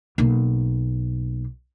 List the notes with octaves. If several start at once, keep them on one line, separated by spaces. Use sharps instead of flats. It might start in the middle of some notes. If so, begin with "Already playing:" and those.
B1 A#3